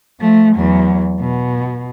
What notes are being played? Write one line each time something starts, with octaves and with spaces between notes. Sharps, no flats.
F3 A3
E2 F#3
B2